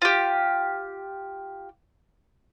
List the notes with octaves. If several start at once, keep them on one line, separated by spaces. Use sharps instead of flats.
F4 G4